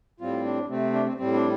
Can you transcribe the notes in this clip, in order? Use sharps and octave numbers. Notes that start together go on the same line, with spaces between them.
A2 G3 C4 F4
D4
C3 A3 C4
D4
C4
A2 G3 C4
D4